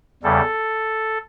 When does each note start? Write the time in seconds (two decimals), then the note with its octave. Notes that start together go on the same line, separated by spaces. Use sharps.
0.23 E2 C#3 G3 A4